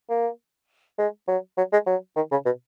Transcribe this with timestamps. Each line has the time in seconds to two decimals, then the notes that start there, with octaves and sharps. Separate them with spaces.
0.10 A#3
0.98 G#3
1.28 F#3
1.57 F#3
1.73 G#3
1.87 F#3
2.16 D#3
2.31 C#3
2.45 B2